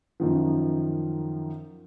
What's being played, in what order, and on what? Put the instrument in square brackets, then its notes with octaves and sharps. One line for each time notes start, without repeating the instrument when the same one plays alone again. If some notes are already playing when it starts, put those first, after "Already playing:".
[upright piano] F#2 D#3 F3